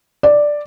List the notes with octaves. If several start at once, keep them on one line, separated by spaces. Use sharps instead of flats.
D5